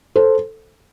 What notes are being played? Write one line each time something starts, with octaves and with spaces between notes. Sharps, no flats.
A4 C5